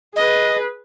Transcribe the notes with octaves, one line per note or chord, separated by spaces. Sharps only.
G#4 B4 D#5